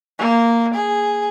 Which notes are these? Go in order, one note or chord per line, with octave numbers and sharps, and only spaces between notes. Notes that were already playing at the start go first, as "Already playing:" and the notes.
A#3
G#4